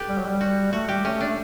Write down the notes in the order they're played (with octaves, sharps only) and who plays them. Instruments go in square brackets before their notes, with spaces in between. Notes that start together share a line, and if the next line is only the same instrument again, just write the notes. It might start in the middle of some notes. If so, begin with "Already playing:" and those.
Already playing: [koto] G4 A4 B4
[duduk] G3
F#3
G3
[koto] F#4
[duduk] A3 [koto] F#4
[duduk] G3 [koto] G4
[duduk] A3 [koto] C#4
[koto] D4
[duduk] A3